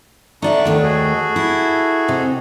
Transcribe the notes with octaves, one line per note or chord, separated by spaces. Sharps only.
D3 D4 D#4 D5 E5 C#6
D#2 D#3 A3
F#4 G#4 A4
E4
C3 D#4